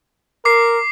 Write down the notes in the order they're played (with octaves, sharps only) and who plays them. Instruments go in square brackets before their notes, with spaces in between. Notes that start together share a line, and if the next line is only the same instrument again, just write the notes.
[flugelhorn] A#4 [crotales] D6 C7